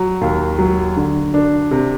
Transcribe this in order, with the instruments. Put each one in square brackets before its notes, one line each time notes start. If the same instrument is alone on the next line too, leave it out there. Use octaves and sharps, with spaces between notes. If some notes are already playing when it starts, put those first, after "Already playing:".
Already playing: [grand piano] F#3
D#2
F#3
D3
D4
C3